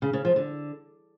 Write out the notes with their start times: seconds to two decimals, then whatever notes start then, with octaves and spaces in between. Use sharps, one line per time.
0.02 C#3
0.13 C#3
0.25 F3
0.36 D3